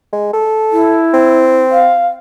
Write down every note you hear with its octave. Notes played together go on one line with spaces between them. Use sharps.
G#3
A4
E4
C4
F5